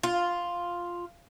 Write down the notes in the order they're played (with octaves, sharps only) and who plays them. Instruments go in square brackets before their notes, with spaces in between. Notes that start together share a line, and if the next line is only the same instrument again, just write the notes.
[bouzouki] F4